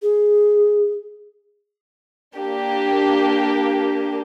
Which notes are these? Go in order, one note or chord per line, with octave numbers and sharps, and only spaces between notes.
G#4
A#3 D4 G4